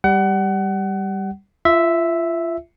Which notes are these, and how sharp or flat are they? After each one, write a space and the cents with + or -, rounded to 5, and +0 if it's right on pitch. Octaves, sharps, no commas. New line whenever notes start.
G3 +0 F#5 +30
F4 -30 E5 +0